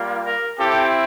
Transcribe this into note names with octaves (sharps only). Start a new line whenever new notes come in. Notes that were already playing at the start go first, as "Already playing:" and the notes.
Already playing: G3 A#3 F4
A#4
C4 E4 G4 A4